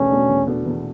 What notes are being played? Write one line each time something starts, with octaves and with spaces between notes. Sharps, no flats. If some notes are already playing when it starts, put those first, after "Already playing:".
Already playing: E2 B2 A3 C#4 D4
B2 A3 D4
E2
B2 A3 D4
E2